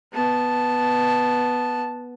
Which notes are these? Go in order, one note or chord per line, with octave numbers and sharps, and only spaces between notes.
B3 A5